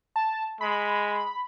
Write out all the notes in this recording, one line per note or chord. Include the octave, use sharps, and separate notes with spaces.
A5
G#3 B5